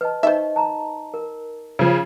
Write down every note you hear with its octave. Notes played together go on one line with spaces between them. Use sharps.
B4 D#5 A5
D#4 C5 D#5 E5 C#6
A5 A#5
A#4
C#3 F3